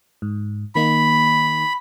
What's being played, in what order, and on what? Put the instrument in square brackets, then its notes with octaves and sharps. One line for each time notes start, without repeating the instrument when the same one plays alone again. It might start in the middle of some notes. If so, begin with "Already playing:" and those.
[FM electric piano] G#2
[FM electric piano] D#3 A#3 D#4 [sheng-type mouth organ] B5